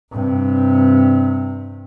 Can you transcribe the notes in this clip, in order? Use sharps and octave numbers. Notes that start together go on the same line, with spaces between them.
G2 C3